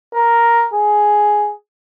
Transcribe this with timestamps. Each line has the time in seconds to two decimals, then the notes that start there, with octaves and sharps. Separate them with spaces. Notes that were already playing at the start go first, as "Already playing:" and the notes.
0.14 A#4
0.74 G#4